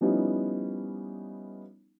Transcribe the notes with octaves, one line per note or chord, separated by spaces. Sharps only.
F3 G3 B3 C#4 D#4 E4